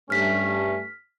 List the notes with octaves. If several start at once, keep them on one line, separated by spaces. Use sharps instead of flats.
G2 A3 C#4 F6 B6